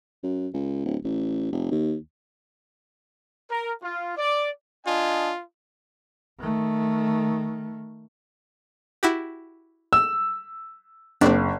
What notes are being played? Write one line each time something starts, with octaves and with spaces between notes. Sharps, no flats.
F#2
C#2
D1
A1
F1
D#2
A#4
F4
D5
D4 F4 D#5 G#5
D#3 A3
E4 F#4 G4
E6
F#1 C4 D4